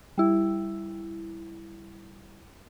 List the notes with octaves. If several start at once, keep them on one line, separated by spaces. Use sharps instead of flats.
G3 E4